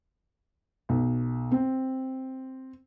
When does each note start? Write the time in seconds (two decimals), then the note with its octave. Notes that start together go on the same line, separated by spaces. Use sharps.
0.89 B1
1.51 C4